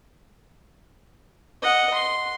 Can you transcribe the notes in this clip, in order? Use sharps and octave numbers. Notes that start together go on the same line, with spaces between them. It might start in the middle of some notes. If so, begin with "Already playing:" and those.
D#5 F#5
C6